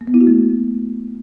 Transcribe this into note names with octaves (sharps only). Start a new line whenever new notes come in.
A#3
B3
E4
F#4
A3